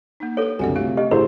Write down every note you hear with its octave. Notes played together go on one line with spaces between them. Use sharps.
A#3 D#4
G4 A4 B4 C#5
C2 F#2 D3 D5 F#5 G#5
C3 A3 F4 F5
G4 D#5
A1 E4 F#4 G#4 C5